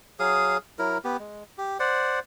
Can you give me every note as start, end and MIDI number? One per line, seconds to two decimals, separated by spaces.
0.19 0.57 54
0.19 0.57 68
0.19 0.57 77
0.19 0.57 87
0.79 0.98 54
0.79 0.98 64
0.79 0.98 70
1.04 1.17 59
1.04 1.17 67
1.19 1.43 56
1.58 1.78 67
1.80 2.19 72
1.80 2.19 74
1.80 2.19 78